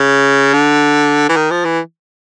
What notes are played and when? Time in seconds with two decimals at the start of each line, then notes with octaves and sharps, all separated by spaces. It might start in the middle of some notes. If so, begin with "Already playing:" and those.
Already playing: C#3
0.53 D3
1.29 E3
1.37 D#3
1.51 F3
1.65 E3